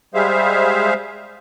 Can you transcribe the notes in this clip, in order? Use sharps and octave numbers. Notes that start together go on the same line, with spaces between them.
G3 G#3 G#4 C5 E5 F5